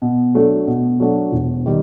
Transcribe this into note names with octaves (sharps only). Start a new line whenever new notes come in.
B2
F#3 A3 D4 F#4
B2
F#3 A3 D4 F#4
E1
D#3 G3